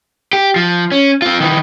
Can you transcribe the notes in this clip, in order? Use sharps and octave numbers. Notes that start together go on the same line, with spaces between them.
G4
F3
C#4
C4 F4
D#3 E3